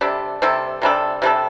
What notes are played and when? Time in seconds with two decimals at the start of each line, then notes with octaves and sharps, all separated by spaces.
0.01 C3 G3 D4 A4
0.42 C3 G3 D4 A4
0.82 C3 G3 D4 A4
1.22 C3 G3 D4 A4